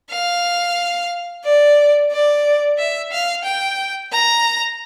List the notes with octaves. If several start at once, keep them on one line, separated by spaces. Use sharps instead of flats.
F5
D5
D5
E5
F5
G5
A#5